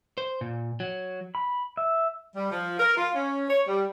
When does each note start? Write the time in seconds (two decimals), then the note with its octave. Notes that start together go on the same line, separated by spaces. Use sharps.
0.18 C5
0.41 A#2
0.80 F#3
1.35 B5
1.77 E5
2.36 G3
2.51 F3
2.80 A#4
2.97 F4
3.15 C#4
3.49 C#5
3.67 G3